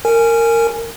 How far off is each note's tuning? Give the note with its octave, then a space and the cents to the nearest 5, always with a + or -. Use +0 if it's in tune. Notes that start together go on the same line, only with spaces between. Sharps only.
A#4 -20 G#5 +0